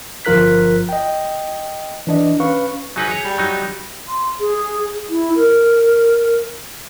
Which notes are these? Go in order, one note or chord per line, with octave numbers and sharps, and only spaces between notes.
G1 F3 F4 A#4 F#6 B6
D#5 G5
E3 D4 D#5
C#4 B4 F5 C#6
F#3 D#4 G#4 B4
C#5
G3
F#3 D#4
C6
G#4
E4
A#4